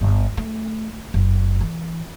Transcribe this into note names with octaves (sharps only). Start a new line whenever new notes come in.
G1
A3
F#1
E3